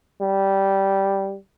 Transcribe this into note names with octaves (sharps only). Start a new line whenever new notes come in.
G3